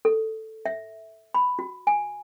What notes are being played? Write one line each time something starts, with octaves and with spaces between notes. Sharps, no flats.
A4
E5
B5
F#4
G#5